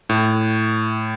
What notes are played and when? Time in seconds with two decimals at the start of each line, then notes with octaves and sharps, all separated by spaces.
0.09 A2